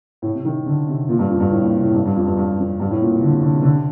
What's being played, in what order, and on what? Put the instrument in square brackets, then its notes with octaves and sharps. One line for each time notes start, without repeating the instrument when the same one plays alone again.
[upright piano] A2
C3
D#3
D3
C3
A#2
G2
F2
G2
A2
A#2
C3
A2
G2
G2
F2
G2
G2
F2
G2
A2
A#2
C3
D3
C3
D3
C3
D3
C3